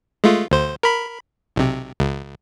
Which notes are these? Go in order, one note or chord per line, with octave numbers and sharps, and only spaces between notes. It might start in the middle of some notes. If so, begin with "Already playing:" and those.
G#3 A3 F4
D2 C5
A#4 B5
B1 C3
C#2